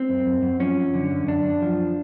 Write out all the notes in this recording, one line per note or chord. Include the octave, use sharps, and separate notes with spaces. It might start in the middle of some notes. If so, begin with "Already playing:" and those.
Already playing: C4
F#2
F#2
F#2
F3 C#4
F#2
D3
F#2
F#2 D4
F#2
F3